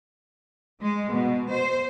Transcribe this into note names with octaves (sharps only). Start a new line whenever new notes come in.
G#3
B2
C5